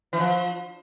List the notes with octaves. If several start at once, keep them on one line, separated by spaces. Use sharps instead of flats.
E3
F3